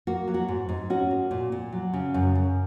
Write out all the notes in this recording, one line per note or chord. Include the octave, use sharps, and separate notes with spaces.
A#3 F#4
F#3
F#4
G#2
G#2
C#4 F#4
A#3
A#2
A#2
F#3
C#3
F#2
F#2